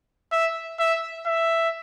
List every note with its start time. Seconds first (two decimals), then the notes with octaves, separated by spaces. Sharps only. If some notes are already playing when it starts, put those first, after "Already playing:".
0.32 E5
0.79 E5
1.26 E5